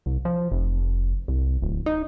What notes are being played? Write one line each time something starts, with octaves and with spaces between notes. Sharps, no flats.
C2
F3
F1
C2
D1
D#4